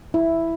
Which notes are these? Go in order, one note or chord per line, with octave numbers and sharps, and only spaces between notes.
E4